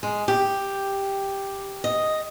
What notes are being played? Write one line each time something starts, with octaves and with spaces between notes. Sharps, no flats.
G#3
G4
D#5